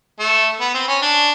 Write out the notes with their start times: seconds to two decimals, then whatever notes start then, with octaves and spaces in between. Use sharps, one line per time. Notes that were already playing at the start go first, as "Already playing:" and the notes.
0.20 A3
0.60 B3
0.75 C4
0.88 C#4
1.02 D4